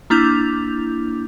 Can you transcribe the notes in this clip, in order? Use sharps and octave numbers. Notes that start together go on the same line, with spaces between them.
A#3 D4 E4 D6 G6 F7